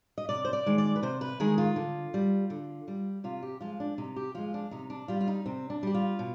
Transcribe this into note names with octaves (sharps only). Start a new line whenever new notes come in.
D#5
C3 D5
C5
D5
D#3 G#3
D5
B4
C3 C5
B4
D#3 G#3 G#4
F4
D3
G3
D3
G3
C3 F4
G4
F3 G#3 F4
D4
C3 D#4
G4
F3 G#3 F4
D4
C3 D#4
D4
G3 F4
F4
D#4
C3 C4
D4
G3 G4
F4
B2